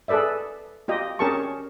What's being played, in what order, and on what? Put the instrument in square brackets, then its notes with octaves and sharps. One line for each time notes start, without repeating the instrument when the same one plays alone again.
[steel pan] G#4 A4 B4 D5 E5
F4 G4 D#5
C#4 G4 G#4 A#4 A5 C#6